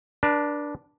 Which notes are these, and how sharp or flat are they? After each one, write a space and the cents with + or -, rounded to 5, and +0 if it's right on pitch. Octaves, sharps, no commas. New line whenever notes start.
D4 +0 B4 -45